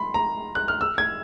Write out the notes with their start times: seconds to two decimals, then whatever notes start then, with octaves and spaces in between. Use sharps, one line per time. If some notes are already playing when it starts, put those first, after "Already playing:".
Already playing: B5 C6
0.14 A#5
0.55 F#6
0.68 F6
0.81 E6
0.98 G#6